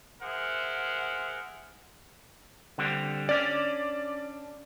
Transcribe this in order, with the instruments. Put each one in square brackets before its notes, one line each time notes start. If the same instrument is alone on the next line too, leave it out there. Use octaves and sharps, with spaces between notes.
[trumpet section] G#4 A#4 C5 E5 F#5
[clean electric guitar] D3 G3 C4
[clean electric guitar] C#4 D4 [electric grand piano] D5